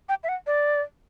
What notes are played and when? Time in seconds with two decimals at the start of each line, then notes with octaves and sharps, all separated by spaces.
0.09 G5
0.24 E5
0.29 F#5
0.47 D5